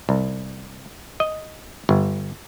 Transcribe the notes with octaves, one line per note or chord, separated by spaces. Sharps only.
C2
D#5
G1